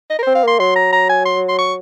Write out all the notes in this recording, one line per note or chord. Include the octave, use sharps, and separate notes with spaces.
D#5
A#4
C4 C5
F5
A#3 C6
F#3 C6
A#5
A#5
G#5
C6
C6
C#6